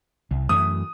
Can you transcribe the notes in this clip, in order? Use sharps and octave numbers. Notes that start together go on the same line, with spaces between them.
C2
F#2 E3 A3 D#6